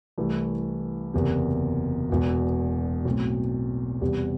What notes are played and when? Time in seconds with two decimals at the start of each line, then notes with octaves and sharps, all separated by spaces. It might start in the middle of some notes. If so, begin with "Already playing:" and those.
0.17 C2 C3 E3 A3 E4
1.14 F#1 E2 C3
2.09 E1 E2 B2
3.05 B1 A2 F#3 C4
4.01 E2 C3 G3